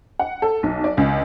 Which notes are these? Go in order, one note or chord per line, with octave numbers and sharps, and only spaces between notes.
F#5
A4
B1
D5
C#2